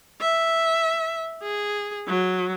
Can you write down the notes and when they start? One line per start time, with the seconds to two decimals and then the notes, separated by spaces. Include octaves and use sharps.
0.21 E5
1.42 G#4
2.07 F#3